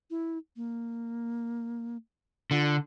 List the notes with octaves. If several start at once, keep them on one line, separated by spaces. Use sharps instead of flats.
E4
A#3
D3 F4